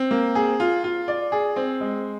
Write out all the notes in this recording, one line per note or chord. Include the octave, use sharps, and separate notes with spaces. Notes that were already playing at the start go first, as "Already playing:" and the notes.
Already playing: C4
A#3
G#4
F4
F4
D5
G#4
C4
G#3